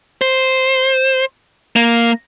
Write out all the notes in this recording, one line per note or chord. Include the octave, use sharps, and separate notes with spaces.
C5
A#3